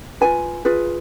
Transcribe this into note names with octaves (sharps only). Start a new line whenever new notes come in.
F4 G#4 B4 G#5
F4 G#4 B4